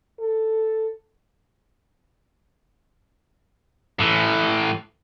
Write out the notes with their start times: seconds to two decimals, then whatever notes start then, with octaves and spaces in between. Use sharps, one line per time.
0.20 A4
4.00 A2 E3